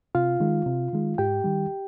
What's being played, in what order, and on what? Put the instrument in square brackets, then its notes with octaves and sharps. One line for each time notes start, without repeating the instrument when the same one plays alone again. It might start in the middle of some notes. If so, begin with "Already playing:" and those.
[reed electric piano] C3 F4 F5
D#3 G#3
C3
D#3 G#3
G#2 G4 G5
D#3 G3